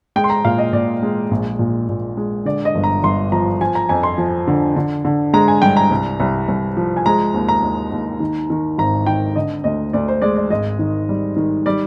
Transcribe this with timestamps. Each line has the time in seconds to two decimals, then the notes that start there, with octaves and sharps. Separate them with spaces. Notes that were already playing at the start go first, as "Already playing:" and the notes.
0.16 G#3 G5
0.24 C6
0.30 A#5
0.45 A#2 F5
0.58 D#5
0.73 A#2 D5
1.02 G#3
1.31 A#1
1.59 A#2
1.89 A#2
2.17 G#3
2.45 D3 D5
2.65 D#5
2.75 G1
2.84 A#5
3.03 G1 C6
3.32 F3 A#5
3.61 F3 G#5
3.75 A#5
3.89 F2 G#5
4.03 C6
4.18 F3
4.47 D3
4.76 D3
5.05 D3
5.33 G#3 A#5
5.48 G#5
5.62 G2 G5
5.77 A#5
5.91 C2
6.20 C2
6.48 C2
6.77 F3
6.97 G#5
7.06 G#3 A#5
7.34 D#2
7.48 A#5
7.63 D#2
7.92 D#2
8.20 D#3
8.50 D#3
8.78 G#1 A#5
9.06 D#3 G5
9.36 D3 D#5
9.64 D2 D#5
9.93 D2 D5
10.08 C5
10.22 G#3 D5
10.36 D5
10.50 G#1 D#5
10.79 D#3
11.09 G3
11.36 D#3
11.66 G3 D5